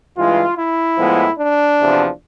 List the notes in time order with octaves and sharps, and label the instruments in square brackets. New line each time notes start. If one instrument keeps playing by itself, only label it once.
[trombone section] G2 E3 G#3 F4
E4
A2 F3 G#3 B3
D4
E2 C3 F3